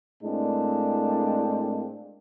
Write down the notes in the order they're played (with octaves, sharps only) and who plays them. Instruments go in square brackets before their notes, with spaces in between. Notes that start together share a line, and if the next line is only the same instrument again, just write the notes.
[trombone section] A2 G#3 A#3 C4 D4